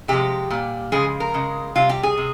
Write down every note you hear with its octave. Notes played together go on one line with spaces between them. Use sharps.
C3 F3 G#3 G4
A#2 G3
C#3 F3 G#3 G#4
A#4
C#3 G#3
C3 G3 F4
G4
G#4
C3